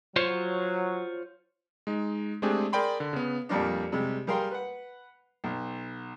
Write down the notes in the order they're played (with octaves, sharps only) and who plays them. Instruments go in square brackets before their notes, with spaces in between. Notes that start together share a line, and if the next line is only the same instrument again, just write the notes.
[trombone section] F#3 [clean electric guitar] F4 C5 C#5
[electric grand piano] G#3 D#4
G#3 A3 C4 D4 G4 G#4
G#4 A#4 D5 G5 B5 C6
D3
C#3 B3
[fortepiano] F2 A#2 G3 A#3 D4
C3 G3 G#3
G3 G#4 A#4 F5 G5 C6
B4 F#5
B1